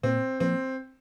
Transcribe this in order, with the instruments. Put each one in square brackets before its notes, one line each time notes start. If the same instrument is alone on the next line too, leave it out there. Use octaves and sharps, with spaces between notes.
[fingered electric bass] A#2 A#3 [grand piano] C4
[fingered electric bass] F3 A#3 [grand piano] C4